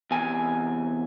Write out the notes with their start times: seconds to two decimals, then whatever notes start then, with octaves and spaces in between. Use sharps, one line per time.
0.11 E2 C3 G#5